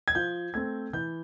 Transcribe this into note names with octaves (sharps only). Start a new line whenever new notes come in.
G#6
F3 G6
A3 C4 G#6
E3 G6